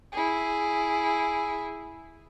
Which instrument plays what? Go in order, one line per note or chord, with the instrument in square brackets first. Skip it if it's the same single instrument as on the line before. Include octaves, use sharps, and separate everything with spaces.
[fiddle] E4 G#4